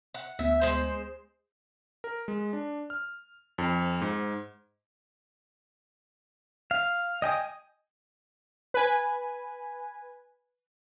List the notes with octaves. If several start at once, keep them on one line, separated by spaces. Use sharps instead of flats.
F#5
D2 B3 E5
G#3 C5
A#4
G#3
D4
F6
F2
G#2
F5
D#5 G5 G#5 D#6
B4 G#5